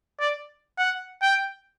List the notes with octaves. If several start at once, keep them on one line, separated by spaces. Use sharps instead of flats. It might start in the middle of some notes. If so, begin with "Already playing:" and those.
D5
F#5
G5